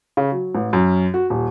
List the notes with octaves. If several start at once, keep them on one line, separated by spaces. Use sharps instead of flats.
C#3
F#3
A1
F#2
F#4
D#1